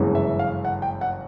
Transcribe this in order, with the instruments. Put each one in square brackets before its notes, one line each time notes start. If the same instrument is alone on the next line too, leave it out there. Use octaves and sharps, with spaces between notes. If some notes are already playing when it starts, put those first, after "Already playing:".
Already playing: [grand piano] G1 F#2 C#3 E3 G#3
E5
F5
F#5
G5
F#5